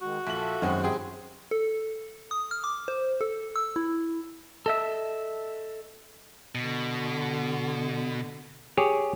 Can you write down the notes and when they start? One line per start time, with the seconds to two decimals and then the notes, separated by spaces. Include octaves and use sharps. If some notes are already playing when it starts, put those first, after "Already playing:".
0.01 D#3 G#3 F#4
0.27 A#1 F4 A4 E5 F#7
0.62 F#2 D#3 G#3 C4
0.84 C4 E4 G4 G#4
1.51 A4
2.31 D#6
2.51 F6
2.64 D6
2.88 C5
3.21 A4
3.56 E6
3.76 E4
4.66 A4 D#5 E5
6.55 B2 D3
8.77 G4 G#4 C#5